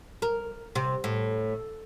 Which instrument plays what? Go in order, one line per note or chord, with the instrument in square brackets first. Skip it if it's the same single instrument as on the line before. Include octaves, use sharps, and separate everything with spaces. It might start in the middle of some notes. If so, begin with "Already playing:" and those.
[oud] A#4
C3
A2